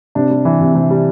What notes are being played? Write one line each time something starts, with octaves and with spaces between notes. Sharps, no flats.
C3 D4
G3
E3
C3
C3
G3